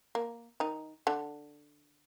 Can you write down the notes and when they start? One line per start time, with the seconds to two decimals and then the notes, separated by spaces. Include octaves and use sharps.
0.15 A#3
0.60 D#3 D#4
1.07 D3 D4